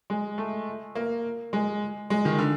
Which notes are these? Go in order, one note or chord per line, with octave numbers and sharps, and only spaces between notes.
G#3
A3
A#3
G#3
G#3
D#3
D3